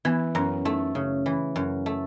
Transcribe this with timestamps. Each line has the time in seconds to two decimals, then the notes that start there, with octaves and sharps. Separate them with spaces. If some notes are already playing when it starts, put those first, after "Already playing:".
0.05 E3 B3
0.35 F#2 C#4
0.65 A3 D#4
0.95 C#3
1.26 E3
1.56 F#2
1.86 A3